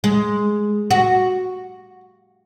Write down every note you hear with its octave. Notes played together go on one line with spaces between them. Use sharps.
G#3
F#4